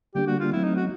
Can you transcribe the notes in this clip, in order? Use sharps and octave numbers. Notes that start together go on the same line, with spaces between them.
D3 G3 A#3 D4 G4
F#4
F4
F#3 A3 C4 E4
D#4
F#4